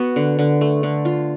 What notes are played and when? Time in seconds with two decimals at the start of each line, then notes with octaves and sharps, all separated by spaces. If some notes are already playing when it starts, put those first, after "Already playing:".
Already playing: B3 F#4
0.16 D3
0.39 D3
0.61 A3
0.83 D3
1.05 F4